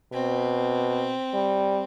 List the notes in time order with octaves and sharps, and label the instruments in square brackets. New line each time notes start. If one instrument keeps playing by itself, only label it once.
[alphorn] B2 [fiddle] C4
[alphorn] G3